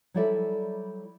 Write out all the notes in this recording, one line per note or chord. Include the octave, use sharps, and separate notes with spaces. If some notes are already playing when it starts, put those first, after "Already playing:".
F#3 G3 E4 A4 D5 E5